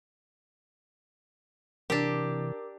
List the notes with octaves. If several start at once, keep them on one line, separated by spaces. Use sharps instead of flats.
C3 E3 D4 G4 A#4